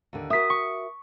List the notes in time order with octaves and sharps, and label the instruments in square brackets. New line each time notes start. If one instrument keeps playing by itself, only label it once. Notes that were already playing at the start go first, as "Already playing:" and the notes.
[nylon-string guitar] D#2 D3
[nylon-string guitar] F#4 A#4 E5 [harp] D#6 B6
[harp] C#6